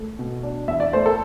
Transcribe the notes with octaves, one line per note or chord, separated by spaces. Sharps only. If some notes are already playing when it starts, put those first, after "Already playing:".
Already playing: A3
B2
D4
E2 E5
D5
A3 C5
A4